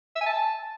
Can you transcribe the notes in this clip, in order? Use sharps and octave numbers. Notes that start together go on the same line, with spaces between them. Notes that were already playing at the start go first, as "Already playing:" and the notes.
E5
G#5
A5